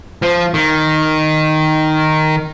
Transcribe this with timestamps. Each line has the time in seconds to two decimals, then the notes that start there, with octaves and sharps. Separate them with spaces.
0.22 F3
0.54 D#3